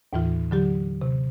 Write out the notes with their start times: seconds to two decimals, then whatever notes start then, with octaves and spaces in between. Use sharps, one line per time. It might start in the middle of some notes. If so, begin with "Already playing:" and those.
0.13 D#2 A2 E3 F4
0.51 D3 F#3 G4
1.02 C3